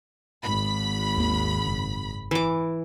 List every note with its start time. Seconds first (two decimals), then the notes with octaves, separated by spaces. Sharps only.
0.43 G#1 B5
1.17 D#2 A#3
1.65 F#1
2.31 E3 D6